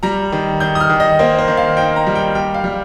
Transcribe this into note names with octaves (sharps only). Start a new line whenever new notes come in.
G3 A#5
D#3
D#3 G6
D#6
F6
D#3
D#5
A#3 C5
C5
D#3
F5
D#4 G5
A#5
G3
G5
G3 G5
F5
G3